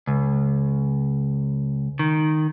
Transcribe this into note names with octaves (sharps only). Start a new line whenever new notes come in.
C#2
D#3